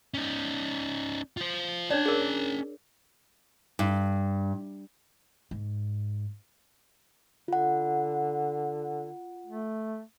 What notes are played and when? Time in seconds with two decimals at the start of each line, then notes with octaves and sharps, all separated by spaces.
0.14 C#4 D#4
1.37 F4 C5
1.90 C#4 D4 C#5 D5 A5
2.06 G#4 A#4
3.79 G2
5.51 G#2
7.48 D3 F4 F#5
9.46 A3